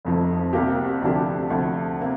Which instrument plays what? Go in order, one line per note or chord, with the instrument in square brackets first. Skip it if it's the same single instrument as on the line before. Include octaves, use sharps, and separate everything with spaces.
[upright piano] F1 F2 F3
C2 C3 A#3 G4
D2 C3 F3 D4 G4
D2 C3 F3
C3 A#3